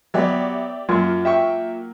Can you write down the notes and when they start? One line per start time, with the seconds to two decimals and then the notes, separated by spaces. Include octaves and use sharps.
0.14 F#3 B3 G4 D5 E5
0.89 F#2 F#3 A#3 F4
1.25 E5 G5 C#6